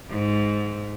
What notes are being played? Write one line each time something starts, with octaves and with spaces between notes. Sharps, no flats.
G#2